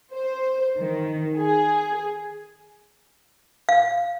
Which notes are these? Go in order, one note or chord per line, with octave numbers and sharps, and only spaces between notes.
C5
D#3
G#4
F5